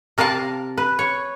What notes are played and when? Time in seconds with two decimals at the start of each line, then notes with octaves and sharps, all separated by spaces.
0.18 C3 A#4 D5 F5 A5
0.78 B4
0.99 C#5